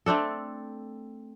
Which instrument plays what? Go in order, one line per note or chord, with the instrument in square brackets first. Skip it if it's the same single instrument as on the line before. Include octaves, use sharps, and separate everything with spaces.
[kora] A3 C4 D4 A4